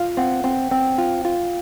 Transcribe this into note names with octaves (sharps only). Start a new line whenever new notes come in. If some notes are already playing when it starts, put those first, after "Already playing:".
Already playing: F4 F5
C4 F#5
C4 G5
C4 G5
F4
F4